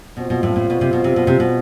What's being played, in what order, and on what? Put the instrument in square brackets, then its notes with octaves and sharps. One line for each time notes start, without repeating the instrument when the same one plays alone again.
[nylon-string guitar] B2 [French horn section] G3 C4 F4 C5
[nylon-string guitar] B2
A2
A2
B2
C3
B2
C3
B2
C3
B2